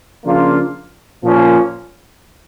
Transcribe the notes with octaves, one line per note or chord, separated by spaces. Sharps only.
C#3 F3 A#3 D4 F4
A#2 F3 A#3 C#4